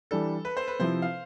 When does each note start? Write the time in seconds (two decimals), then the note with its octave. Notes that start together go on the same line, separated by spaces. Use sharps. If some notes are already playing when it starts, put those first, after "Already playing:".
0.11 E3 G3 D4 A4
0.45 B4
0.57 C5
0.68 B4
0.79 C3 F3 C4 E4 C5
1.02 F5